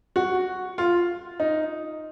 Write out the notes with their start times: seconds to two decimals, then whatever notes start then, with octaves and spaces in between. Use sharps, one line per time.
0.16 F#4
0.78 F4
1.40 D#4